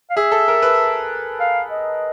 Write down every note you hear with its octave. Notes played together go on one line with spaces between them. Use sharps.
F5
G#4 E5
A4
A#4
B4
F5
D#5